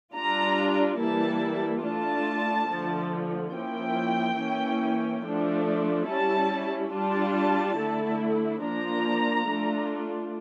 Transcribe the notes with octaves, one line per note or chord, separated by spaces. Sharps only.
G3 D4 F4 A#5
E3 G3 A#3 E4 A5
A3 D4 F4 A5
D3 F3 A3
F3 A#3 C#4 E4 G5
E3 A#3 C#4 E4
F3 A3 D4
G3 C#4 E4 A5
G3 D4 F4 A5
D3 A3 E4
F3 A#3 D4 F4 A#5
A3 D4 F4